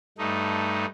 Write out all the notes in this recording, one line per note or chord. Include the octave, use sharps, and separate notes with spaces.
G2 A3 D#4